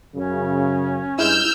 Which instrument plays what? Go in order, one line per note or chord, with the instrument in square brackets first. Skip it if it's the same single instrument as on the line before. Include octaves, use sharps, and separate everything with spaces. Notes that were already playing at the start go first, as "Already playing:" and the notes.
[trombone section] F#2 C#3 [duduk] C#4
[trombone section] G2 G#3 [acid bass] E4 [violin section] E6 F6 G6